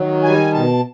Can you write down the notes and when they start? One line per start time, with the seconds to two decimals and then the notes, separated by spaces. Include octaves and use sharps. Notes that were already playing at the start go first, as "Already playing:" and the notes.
Already playing: D#3 F#3
0.24 G3 G#5
0.53 B2 A5